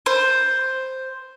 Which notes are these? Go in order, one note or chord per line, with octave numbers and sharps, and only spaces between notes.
C5